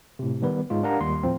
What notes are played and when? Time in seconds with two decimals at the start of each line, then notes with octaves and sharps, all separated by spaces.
0.19 A2 C3
0.42 D#3 G3 B3 B4
0.70 G#2 G#3 F4
0.83 D4 G4 A#4 F5 F#5 A#5
1.01 D#2 G3 C6
1.23 A2 F3 C4